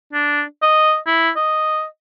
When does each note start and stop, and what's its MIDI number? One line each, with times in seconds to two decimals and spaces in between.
0.13 0.43 62
0.62 0.97 75
1.07 1.30 64
1.36 1.85 75